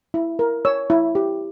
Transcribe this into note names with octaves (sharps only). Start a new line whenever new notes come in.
E4
A#4
C#5 E6
E4
G4